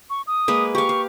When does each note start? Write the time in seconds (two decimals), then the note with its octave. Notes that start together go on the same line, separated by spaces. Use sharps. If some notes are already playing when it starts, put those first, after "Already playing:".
0.10 C#6
0.27 D#6
0.48 G#3 A#3 B4
0.75 G4 F5 C#6
0.89 F5